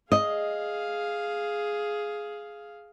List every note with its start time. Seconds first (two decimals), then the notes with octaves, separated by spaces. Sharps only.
0.12 G#4 D#5 F5